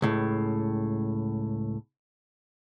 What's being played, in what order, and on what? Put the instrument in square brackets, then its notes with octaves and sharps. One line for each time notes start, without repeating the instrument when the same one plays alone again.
[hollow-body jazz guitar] C#2 A2